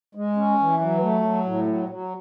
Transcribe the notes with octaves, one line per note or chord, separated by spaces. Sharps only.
G#3
C#4
E3
F#3
A3
F#3
A2
F#3
F#3